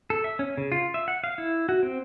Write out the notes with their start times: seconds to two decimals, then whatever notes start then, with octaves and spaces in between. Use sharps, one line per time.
0.10 A4
0.24 E5
0.39 C#4
0.58 C#3
0.72 F4
0.94 E5
1.08 F#5
1.24 F5
1.38 E4
1.69 F#4
1.83 C4